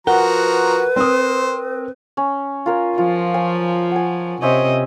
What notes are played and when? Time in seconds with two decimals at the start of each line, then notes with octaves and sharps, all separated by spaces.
0.07 F3 F#4 A#4 B4 F#5 A#5
0.96 C4 C5 D#6
2.17 C#4
2.66 F4 A#4 G#5
2.98 F3 F4
3.34 G#5
3.91 F#5 G#5
4.42 C3 C#4 C5 D#5 E5